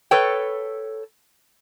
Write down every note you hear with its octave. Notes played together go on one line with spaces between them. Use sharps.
A4 B4 C#5 G5